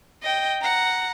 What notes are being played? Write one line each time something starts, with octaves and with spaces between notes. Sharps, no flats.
D#5 G5
F#5 A#5